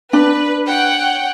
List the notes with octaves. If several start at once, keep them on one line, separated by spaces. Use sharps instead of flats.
D4 B4
C#5 F#5 G5